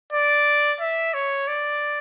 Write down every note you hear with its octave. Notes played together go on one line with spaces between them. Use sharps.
D5
E5
C#5
D5